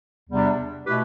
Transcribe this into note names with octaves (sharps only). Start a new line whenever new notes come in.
E2 C3 G3 D4
B2 A3 E4 G4 B4